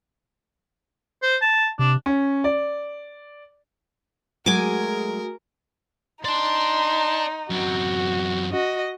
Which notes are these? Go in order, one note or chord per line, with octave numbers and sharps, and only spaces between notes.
C5
A5
C3 D4
C#4
D5
F#3 G#3 A3 F#4 G#4 A#4 G#5 D6
D#4 D5 A5 C6
F#2 C4 F#4
F#4 D#5